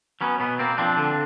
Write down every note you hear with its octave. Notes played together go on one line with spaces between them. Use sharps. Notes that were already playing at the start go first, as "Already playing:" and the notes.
F#3 B3 C#4
B2 B3
A#3 C4
F3 C4 D4
D3